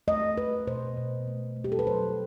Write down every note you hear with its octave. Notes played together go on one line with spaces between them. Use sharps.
A3 D#5
A3 B4
B2 C5
B2
A3
A3
G4
A4
B4
F#3 C5